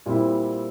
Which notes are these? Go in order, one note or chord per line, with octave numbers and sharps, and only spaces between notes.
A#2 G3 C4 E4